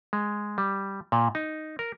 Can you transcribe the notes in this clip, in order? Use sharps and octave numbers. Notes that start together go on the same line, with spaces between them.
G#3
G3
A#2
D#4
A#4